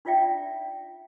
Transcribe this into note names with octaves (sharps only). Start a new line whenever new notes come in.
D4 D#4 F4 D5 E5 G5